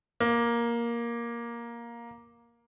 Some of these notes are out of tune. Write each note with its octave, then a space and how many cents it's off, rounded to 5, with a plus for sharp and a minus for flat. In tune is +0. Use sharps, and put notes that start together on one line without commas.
A#3 +10